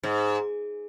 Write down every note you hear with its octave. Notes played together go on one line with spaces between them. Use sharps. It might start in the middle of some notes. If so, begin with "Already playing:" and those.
G#2